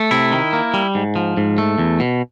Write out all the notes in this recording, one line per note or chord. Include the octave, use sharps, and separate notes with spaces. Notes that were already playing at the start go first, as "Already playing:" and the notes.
Already playing: A3
C3 E4
D#3
A#3
G3
G#2
F3
G#2
A3
E2
B2